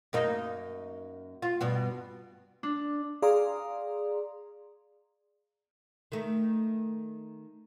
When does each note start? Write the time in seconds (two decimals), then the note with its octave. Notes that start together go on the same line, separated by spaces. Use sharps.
0.13 F#2 A#3 D#4
1.42 F4
1.61 G2 B2 B3
2.63 D4
3.22 G#4 D5 F5 A#5 C6 D#6
6.12 D#3 A3